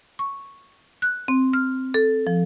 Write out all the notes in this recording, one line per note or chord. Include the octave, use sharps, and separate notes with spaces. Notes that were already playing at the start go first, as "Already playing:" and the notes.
C#6
F#6
C4
F6
A4
F3